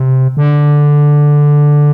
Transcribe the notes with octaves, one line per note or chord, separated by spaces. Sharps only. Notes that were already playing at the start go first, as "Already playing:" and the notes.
Already playing: C3
D3